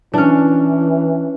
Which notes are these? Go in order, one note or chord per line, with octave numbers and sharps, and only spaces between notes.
E3 C#4 D4